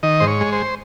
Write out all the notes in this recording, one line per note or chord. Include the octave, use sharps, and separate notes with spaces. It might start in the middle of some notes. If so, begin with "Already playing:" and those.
D#3 D#5
G#2 C5
C#5
G#3
C5